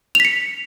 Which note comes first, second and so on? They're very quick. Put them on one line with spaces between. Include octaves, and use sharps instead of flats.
F7 B6 C#7